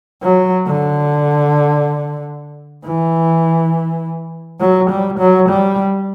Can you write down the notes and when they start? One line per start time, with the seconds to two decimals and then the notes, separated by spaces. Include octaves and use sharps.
0.22 F#3
0.67 D3
2.85 E3
4.60 F#3
4.90 G3
5.19 F#3
5.49 G3